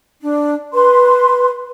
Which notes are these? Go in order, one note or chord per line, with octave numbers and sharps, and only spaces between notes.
D4
B4 C6